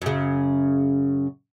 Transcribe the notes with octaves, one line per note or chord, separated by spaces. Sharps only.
F#2 C#3